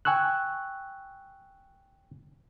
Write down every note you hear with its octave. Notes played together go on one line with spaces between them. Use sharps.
G5 G#5 C#6 E6 F#6